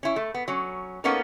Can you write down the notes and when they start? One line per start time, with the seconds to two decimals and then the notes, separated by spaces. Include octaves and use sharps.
0.03 C#4 E4
0.16 A3
0.34 B3
0.48 F#3 C#4
1.04 A#3 B3 C#4 D#4 A4 A#4